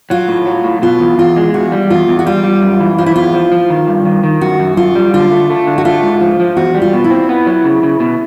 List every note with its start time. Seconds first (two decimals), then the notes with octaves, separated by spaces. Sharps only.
0.10 F#3 F4
0.28 A2
0.46 F#3
0.64 A2
0.82 B2 F4
1.00 E2
1.18 E2 F4
1.37 G#3
1.54 E2 F#4
1.72 G3
1.90 E2 F4
2.08 E2
2.19 F#4
2.26 G3 F4
2.44 G3
2.62 F#2
2.80 E3
2.98 F3 F4
3.06 E4
3.16 E2 F4
3.34 F3
3.52 F3
3.70 D#3
3.87 G2
4.05 D#3
4.24 D#3
4.41 F#2 F#4
4.59 F#2
4.77 F#2 F4
4.95 G3
5.14 D3 F4
5.32 A3
5.50 A3
5.67 D3
5.78 F#4
5.85 A3 F4
6.03 G#2
6.21 F3
6.40 F3
6.57 E2 F#4
6.75 G3
6.82 F4
6.93 B2
7.04 E4
7.11 C4
7.29 B3
7.47 F#3
7.64 C#3
7.83 C#3
8.00 B2